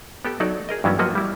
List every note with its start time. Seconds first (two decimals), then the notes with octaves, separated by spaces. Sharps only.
0.25 B3 G4 A4
0.40 F#3 D#4 A4 C#5 D5
0.69 G#4 A#4 D#5
0.84 G2 E3 F#3 B3 C#4
0.99 F3 F#3 A#3 F#4 B4 D#5
1.15 G3 E4